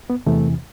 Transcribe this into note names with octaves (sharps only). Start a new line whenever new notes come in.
B3
E2 C3 E3 A3